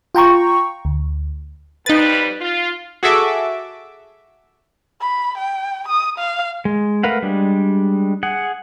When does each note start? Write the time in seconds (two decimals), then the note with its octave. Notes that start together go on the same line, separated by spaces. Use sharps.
0.15 F4 G5 A#5 C#6
0.85 D2
1.86 F2 G3 D#4 B4 A6
2.41 F4
3.03 F#4 G#4 A4 E5 D6
5.01 B5
5.38 G5
5.88 D#6
6.19 F5
6.65 G#3
7.03 A3 A#4 B4 F5 F#5
7.23 G3 G#3 D4
8.23 G#4 F#5